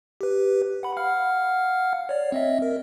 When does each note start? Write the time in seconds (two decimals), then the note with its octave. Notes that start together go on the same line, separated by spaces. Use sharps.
0.21 G4 B4
0.83 F#5 B5
0.97 F5 F#5 F6
2.09 C#5 D5
2.32 C4 D#5 E5
2.62 A#4